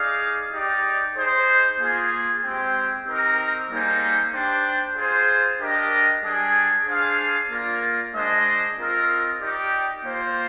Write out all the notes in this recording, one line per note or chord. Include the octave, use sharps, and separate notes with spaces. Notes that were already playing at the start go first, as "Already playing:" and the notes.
Already playing: D#4 G#4 D5 F5
D#4 G4 D5
D#4 G#4 C5
A#3 F4 G#4
G#3 C4 G4 C5 G5
C4 D#4 G4 A#4
G3 A#3 D#4 G#4 C5
D4 G4 C5 G5
F4 G#4 C5
D4 G4 A#4 D#5
G3 D4 G#4
D4 G#4 C5 F5
A#3 F4 A#4 D5
G#3 D4 G#4 C5 D#5
C4 F4 A#4 D#5
D#4 G4 D5 G5
A#3 F4 C5